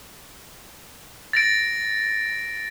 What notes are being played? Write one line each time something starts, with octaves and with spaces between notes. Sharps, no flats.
A6 A#6 D7